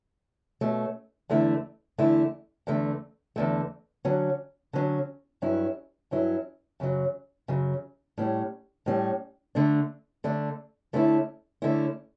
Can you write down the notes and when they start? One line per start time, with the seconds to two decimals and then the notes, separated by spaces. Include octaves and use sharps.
0.61 B2 A3 C#4
1.30 E2 D3 A3 E4
1.98 E2 D3 A3 E4
2.67 E2 D3 A3
3.36 E2 D3 A3
4.05 D3 F#3 C#4
4.73 D3 F#3 C#4
5.42 G2 F#3 C#4 E4
6.11 G2 F#3 C#4 E4
6.80 F#2 C#3 F#3
7.48 F#2 C#3 F#3
8.18 A2 G3 C#4
8.86 A2 G3 C#4
9.55 D3 A3 D4
10.24 D3 A3 D4
10.93 D3 A3 C#4 E4
11.62 D3 A3 C#4 E4